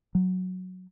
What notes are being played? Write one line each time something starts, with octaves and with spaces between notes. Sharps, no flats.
F#3